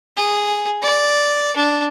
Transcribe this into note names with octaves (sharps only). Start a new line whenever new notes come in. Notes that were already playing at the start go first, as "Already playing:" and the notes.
G#4
D5
D4